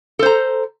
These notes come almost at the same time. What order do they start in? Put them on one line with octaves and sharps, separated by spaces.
A4 C5 A#5